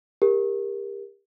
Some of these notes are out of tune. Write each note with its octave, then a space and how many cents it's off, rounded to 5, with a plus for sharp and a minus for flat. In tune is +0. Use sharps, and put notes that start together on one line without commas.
G4 +30 A#4 +10